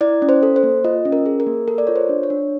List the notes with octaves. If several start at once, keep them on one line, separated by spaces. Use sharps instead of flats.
E4 D5
C#4
C5
A4
C5
A#3
F4 D#5
C#4
A#4
G#4
A#4
A#3
A4 A#4
D5
F4 C#5
C5
D4
C#5
D4